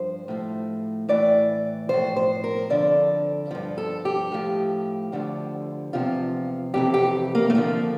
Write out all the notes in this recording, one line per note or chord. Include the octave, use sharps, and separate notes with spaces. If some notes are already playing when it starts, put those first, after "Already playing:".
Already playing: G2 F3 C5
A2 F3
A2 E3 D5
A2 F3 C5
C5
A#4
F2 D3 F3 D5
G2 F3
A4
G4
A2 F3
D2 D3 F3
E2 C3 F3 F4
F2 C3 E3 G4
G4
A#3
A3
F2 D3 F3 A#3